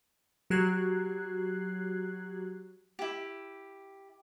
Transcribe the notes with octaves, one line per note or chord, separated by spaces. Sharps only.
F#3 F#4 G4 F#6 G#6 C7
E4 G4